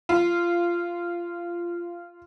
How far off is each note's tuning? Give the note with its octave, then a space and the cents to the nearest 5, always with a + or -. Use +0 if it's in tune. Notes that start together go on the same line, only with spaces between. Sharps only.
F4 -15